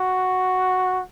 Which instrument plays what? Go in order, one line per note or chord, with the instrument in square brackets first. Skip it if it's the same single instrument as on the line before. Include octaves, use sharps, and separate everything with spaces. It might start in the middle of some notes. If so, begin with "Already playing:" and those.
Already playing: [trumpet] F#4